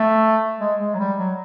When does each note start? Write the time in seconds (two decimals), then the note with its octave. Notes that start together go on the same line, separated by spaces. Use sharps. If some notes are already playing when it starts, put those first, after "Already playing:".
Already playing: A3
0.61 G#3
0.80 G#3
0.94 F#3
1.00 G3
1.19 F#3